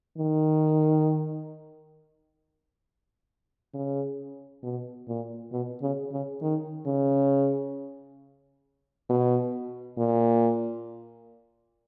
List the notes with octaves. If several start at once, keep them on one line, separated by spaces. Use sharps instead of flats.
D#3
C#3
B2
A#2
B2
C#3
C#3
D#3
C#3
B2
A#2